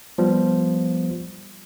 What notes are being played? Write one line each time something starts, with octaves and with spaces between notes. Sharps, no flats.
F3 G3 B3